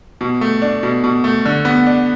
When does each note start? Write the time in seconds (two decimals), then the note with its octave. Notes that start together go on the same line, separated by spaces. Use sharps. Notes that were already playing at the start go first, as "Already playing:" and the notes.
0.21 B2
0.41 A3
0.62 D4
0.83 B2
1.04 B2
1.24 A3
1.45 D3
1.65 B3
1.86 D4